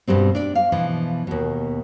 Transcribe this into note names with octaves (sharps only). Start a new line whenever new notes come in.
G2 B2 G3 C4
D4 D5
F5
B2 E3 F3
D#2 B2